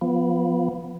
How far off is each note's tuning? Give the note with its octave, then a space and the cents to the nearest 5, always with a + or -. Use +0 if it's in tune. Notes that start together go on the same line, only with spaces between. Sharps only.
F3 +0 B3 +0